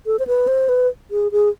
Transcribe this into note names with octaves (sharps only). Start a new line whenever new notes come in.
A4
C5
B4
C5
B4
G#4
G#4